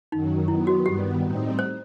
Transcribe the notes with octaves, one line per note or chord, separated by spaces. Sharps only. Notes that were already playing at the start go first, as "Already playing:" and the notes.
F#2 D#3 F#3 D#4
D#3 F#3 B3 E4
F#4
G2 D#3 G3 B3 G4
A2 G3 C4 D#4
C5